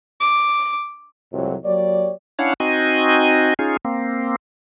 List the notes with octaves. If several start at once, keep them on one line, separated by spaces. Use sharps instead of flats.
D6
C2 F2 A2 C3 F#3
F#3 A#3 G4 C#5 D5
C#4 D4 E4 C#5 F5 F#5
C4 D#4 F#4 D#5 G#5
C#4 D#4 F4 G#4
A#3 C4